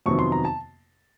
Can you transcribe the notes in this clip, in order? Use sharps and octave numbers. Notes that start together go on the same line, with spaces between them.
F2 C3 D#3 F#3 B3 C#6
C6
A#5
A5